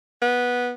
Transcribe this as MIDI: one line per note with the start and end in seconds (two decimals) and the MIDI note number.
0.22 0.71 59